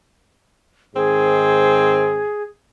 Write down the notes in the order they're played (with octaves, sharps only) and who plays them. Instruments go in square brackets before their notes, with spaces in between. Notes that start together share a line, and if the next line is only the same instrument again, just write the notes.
[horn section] G#2 D#3 C4 [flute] G#4